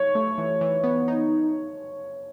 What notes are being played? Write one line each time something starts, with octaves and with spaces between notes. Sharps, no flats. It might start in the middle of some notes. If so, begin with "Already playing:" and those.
Already playing: C#5
A3
E3
E3
B3
D#4